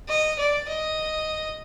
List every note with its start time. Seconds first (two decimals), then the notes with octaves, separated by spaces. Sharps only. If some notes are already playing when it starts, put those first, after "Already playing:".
0.08 D#5
0.39 D5
0.68 D#5